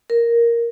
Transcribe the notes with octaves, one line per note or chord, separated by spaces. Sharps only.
A#4